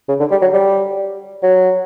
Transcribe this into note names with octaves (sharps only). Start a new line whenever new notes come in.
C#3
D3
G3
F#3
G3
F#3